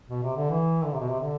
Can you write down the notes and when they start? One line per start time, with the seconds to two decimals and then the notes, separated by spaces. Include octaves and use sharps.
0.09 B2
0.23 C3
0.37 D3
0.50 E3
0.85 D3
0.93 C3
1.00 B2
1.09 C3
1.21 D3